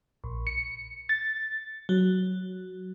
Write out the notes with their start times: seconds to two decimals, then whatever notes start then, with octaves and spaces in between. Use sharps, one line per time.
0.24 A#1
0.47 C#7
1.09 A6
1.89 F#3